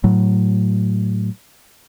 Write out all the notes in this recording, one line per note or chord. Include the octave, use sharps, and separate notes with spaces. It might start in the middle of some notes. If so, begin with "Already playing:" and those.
A2 F#3